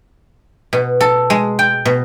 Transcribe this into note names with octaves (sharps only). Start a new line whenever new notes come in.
B2
A4
G#3
G5
B2